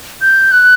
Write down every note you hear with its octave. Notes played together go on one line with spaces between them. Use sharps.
G6
F#6